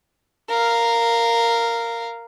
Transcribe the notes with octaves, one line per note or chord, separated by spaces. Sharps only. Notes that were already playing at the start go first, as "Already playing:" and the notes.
A#4 F5